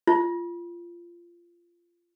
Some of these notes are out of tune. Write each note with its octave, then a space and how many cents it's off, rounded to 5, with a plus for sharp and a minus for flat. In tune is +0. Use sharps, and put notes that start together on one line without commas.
F4 -15